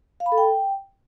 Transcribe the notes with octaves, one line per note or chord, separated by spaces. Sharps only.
F5
B5
A4
G5